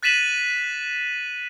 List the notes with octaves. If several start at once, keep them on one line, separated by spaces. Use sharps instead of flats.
F#6 A6 B6 D#7 E7 F#7